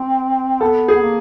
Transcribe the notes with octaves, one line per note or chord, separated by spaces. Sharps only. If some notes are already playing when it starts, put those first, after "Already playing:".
Already playing: C4
B3 A4
G#4
B3
A#3